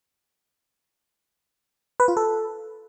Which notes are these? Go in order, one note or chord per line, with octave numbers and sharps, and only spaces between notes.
B4
F4
A4